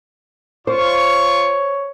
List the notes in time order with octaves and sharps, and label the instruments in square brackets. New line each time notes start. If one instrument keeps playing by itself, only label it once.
[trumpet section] F4 C#6 [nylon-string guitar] C5 [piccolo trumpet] C#5